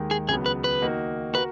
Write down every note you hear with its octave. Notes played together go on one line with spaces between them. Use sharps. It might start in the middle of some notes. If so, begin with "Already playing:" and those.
Already playing: D#2 D#3 G#3
G#4
C#2 C#3 F#3 B3 G#4
B4
B4
D#3 A#3 D#4 F#4
F#4 A#4 B4